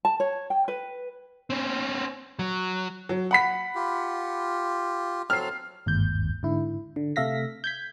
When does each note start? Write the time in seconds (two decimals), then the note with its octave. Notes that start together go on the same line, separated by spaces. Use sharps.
0.05 A5
0.20 C#5
0.50 G5
0.68 B4
1.50 C4 C#4
2.39 F#3
3.09 F#3
3.31 F#5 B5 B6
3.75 F4 G4
5.30 F#3 C4 A4 F6 C7
5.86 G1 D#2 G#2 G6
6.43 G#2 D3 E4
6.96 D3
7.16 C3 A3 E5 F5 A#6 B6
7.64 G6 G#6 B6